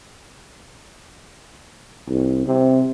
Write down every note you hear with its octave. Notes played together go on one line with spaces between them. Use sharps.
C2
C3